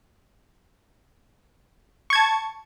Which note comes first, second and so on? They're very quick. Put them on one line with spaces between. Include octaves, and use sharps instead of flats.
C#6 G#6 A5